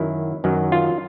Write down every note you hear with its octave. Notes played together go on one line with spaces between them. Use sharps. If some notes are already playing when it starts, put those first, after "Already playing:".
Already playing: F#2 D#3 F#3 E4
F#2 D#3 F#3
F4